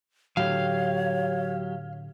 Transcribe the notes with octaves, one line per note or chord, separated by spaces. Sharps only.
A2 D3 F#3 G4 C#5 F5